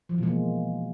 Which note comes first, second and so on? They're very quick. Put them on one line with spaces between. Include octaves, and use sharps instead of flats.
F3 E3 B2 G#3 A#3